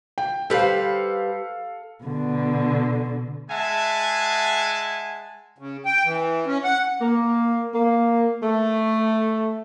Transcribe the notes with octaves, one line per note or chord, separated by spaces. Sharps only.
G5
G3 A4 B4 C5 F5
B2 D3
G#3 E5 F#5 G#5 A5
C#3
G5
E3
C#4
F#5
A#3
A#3
A3